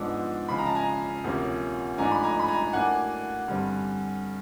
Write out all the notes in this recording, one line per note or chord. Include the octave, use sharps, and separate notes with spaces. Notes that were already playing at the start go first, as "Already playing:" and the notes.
Already playing: G#2 F3 G#3 B3 D4 E6
C#3 F3 G#3 B5
A#5
A5
G#5 A#5
D2 C3 F3 A#3 C#4
G#2 F3 A3 D4 G#5 A#5
B5
G#5 A#5
B5
G#5 A#5
A2 F#3 A#3 D4 F#5 G#5
G2 D3 G3 C4